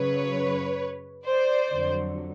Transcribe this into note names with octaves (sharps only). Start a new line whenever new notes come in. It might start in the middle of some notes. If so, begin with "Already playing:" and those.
Already playing: F#2 C#3 F#3 B4 C#5
C5 D5
F2 D3 F#3